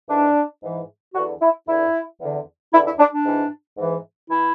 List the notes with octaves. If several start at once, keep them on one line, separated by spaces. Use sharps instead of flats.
G#2 E3 D4
G#2 E3
E2 D3 F#4
E4
E2 D3 E4
E2 D3
E2 D3 E4
E4
D4
D4
G#2 E3
G#2 E3
E3 E4